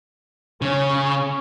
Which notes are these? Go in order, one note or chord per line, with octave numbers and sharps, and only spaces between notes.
C#3 C#4